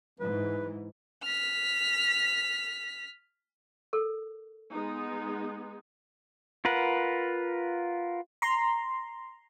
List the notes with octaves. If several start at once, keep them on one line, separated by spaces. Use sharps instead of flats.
G#2 E3 B4
F6 B6
A4 A#4
G#3 B3 D#4
F4 A#4 B4 F#5
A#5 C6